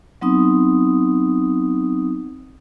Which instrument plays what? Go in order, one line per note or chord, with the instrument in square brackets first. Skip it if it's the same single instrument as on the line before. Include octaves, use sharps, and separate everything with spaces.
[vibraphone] F#3 B3 C4 D#4 D#6